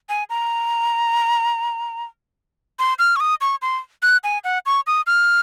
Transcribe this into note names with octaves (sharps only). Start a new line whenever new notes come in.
G#5
A#5
C6
F6
C#6
D#6
C#6
C6
F#6
G#5
F#5
C#6
D#6
F6